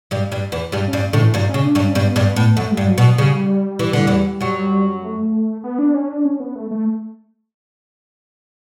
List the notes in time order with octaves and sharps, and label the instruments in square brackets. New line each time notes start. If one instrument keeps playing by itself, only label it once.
[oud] G2 G3
G2 G3
E2 E3
G2 G3
[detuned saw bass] C#4
[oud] G2 G3
[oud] A2 A3 [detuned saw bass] D3
[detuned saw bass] E3
[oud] G2 G3 [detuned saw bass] F#3
[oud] C#3 [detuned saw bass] C#4
[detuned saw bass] D4
[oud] G2 G3
[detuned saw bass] C#4
[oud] G2 G3 [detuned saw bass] B3
[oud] G2 G3
A2
[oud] F#2 [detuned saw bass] A3
[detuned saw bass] G3
[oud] G2
[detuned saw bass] F#3
[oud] B2
[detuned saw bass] F#3
[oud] C#3 [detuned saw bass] G3
[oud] E3
D3
E2 E3
F#2 F#3
[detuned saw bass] A3
B3
D4
C#4
D4
C#4
B3
A3
A3